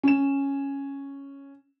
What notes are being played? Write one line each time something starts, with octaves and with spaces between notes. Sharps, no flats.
C#4 E7